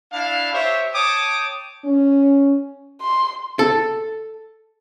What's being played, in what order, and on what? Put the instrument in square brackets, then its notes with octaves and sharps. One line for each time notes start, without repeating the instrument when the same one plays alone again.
[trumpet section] D4 E4 F5
G4 C5 C#5 E5
C#5 G5 A5 D6 D#6
[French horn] C#4
[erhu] C6
[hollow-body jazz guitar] A4